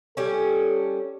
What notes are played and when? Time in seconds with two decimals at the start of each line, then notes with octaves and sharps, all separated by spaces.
0.17 G3 C#4 A4